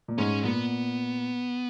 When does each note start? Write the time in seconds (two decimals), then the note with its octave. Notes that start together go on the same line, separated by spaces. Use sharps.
0.08 A#2
0.18 G#2 C#4
0.44 A#2 B3